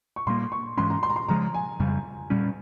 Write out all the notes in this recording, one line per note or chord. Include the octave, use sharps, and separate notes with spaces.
C#6
A#2 G3 A#3 C6
C#6
G#2 E3 G#3 C#4 C6
A#5
C6
A#5
C6
C#3 F3 G#3 A#5
G#5
F2 C#3 G3
A#2 G3 C#4